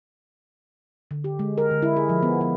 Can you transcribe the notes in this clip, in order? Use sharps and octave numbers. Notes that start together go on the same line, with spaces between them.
D3
G4
G#3
A#4
D3
E4
G#4
F3
B3
B3